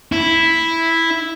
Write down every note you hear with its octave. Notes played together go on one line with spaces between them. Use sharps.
E4